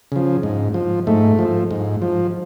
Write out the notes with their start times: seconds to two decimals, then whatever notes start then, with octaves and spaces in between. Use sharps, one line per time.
0.12 C#3 F3
0.43 G#2
0.74 F3
1.07 G#2 A3
1.39 F3
1.71 G#2
2.02 F3